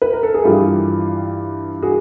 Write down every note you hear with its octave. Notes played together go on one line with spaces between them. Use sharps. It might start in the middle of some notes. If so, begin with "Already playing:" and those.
B4
A#4
A4
G#4
G2 E3 F4 G4
F#4 G#4